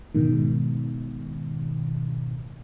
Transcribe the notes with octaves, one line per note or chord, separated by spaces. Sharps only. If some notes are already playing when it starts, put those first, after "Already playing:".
G#2 B2 D#3